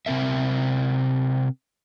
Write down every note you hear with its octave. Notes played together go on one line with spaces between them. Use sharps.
C3 C4 A#4 E5